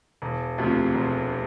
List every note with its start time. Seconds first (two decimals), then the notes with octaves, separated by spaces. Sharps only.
0.22 E1
0.58 D2 C3 F3
0.95 E1